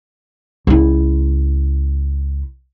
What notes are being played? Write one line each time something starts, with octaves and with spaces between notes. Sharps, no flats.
C#2 E4